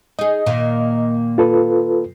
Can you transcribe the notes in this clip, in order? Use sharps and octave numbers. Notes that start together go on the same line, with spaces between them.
D#4 G#4 D#5
A#2 D#3 A#3
F4 A4 B4